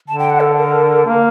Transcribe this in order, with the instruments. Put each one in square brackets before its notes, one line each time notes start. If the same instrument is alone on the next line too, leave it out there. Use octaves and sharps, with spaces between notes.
[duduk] D3 [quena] A5
[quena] G5
F#5
A4
A#4
[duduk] A#3